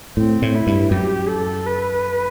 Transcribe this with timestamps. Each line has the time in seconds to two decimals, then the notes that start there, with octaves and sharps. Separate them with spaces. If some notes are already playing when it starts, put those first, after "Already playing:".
0.17 A2 C4
0.42 A2
0.54 E4
0.67 G2
0.91 F#2 G4
1.28 A4
1.66 B4